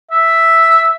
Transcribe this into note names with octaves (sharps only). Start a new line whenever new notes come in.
E5